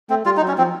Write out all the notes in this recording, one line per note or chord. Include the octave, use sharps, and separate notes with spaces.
A3 C4
G3 F4
D#4
F#3
C#4
F3 C4